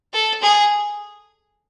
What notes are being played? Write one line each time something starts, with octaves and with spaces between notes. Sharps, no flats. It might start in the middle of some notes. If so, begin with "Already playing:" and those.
A4
G#4